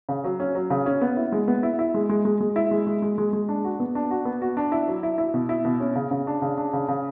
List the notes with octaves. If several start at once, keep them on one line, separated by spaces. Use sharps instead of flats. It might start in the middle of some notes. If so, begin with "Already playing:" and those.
C#3
F#3
C#4
F#3
C#3
C#4
B3
E4
G#3
B3
E4
E4
G#3
G#3
G#3
G#3
E4
G#3
G#3
G#3
G#3
G#3
D4
F#4
B3
D4
F#4
B3
F#4
D4
E4
F#3
E4
E4
B2
E4
B2
C#4
C#3
C#3
D4
C#3
D4
C#3
C#3